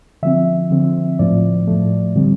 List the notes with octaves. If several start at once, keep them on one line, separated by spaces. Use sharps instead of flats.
D3 F3 C4 E5
D3 F3 C4
A2 F3 A3 D5
A2 F3 A3
D3 G3 C4